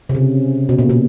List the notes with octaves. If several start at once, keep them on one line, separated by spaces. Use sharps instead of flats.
C3
C#3
B2
A#2
B2